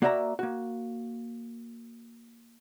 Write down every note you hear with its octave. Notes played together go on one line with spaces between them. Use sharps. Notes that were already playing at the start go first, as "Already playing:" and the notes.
A#3 F#4 D5 E5 G5 A#5
A#3 F#4